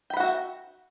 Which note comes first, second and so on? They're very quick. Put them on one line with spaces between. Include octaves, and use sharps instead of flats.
G5 B5 F#5 F#4 E5